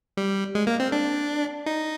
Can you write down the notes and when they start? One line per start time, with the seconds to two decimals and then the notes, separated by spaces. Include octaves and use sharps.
0.17 G3
0.55 G#3
0.67 A#3
0.80 C4
0.92 D4
1.66 D#4